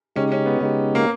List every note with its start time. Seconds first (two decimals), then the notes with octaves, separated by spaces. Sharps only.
0.16 C#3 G#3 C#4 D#4 G4
0.32 C#4
0.46 B3
0.61 C#3 G#3 D#4 G4
0.95 A#3